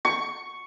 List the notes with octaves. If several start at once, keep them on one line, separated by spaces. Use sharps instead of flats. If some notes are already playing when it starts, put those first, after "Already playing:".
C#6